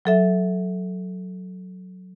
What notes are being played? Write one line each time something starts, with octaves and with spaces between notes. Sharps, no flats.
F#3 A4 E5